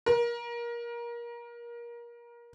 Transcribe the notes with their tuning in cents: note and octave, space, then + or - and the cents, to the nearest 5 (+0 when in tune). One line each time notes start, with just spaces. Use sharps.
A#4 +25